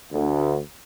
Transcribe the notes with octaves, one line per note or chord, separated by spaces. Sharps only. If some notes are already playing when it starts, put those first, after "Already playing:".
D2